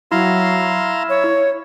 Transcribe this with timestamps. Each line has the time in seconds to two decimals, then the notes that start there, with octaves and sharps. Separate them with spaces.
0.12 F#3 E4 F5 A#5 C6
1.09 C#5